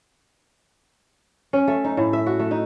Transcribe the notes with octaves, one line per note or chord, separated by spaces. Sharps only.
C#4
A3
D#4
A2
E5
F#4
A3
D#4